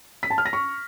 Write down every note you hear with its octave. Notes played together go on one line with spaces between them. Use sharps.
B6
A5
F6
A#6
C#6